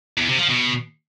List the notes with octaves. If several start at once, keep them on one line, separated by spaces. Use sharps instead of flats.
E2
C3
F3
B2